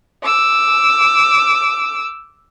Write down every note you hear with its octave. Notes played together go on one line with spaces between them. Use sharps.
D6 E6